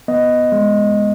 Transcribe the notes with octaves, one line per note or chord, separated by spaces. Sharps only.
B3 D#5
G#3